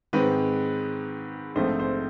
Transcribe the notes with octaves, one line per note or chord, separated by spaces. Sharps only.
G#2 D#3 G#3 C4 B4
A#1 G#2 F3 A3 C4 C5
C5